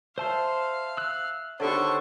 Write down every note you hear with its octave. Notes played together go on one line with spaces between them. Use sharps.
C5 E5 F5 A5 C6
E6 F#6
D3 D#3 B3 G4 A4 C5 C#5 C#6